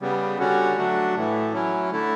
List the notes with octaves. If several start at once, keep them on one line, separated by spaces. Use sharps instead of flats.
C#3 G3 B3
D3 G3 C#4 F#4
F#3 A3 D4 F#4
A2 E3 A3
F#3 C#4 E4
D3 A3 E4